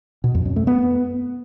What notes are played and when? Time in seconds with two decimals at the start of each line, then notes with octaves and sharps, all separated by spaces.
0.24 B2
0.35 F2
0.45 F#2
0.56 A3
0.67 B3